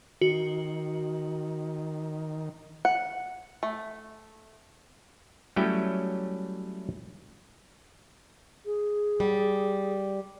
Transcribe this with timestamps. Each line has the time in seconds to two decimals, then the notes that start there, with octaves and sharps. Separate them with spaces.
0.21 D#3 F#4
2.85 F#5
3.63 A3
5.56 F#3 G3 A3 C#4 E4 G5
8.65 G#4
9.20 G3